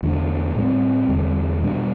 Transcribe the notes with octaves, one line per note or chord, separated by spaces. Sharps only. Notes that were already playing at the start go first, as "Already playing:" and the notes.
E2 D3 A3 D4
A2 G3 C4
E2 D3 G3
B2 G3 D4